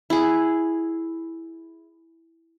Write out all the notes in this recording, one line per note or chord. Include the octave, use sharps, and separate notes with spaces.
E4 G#4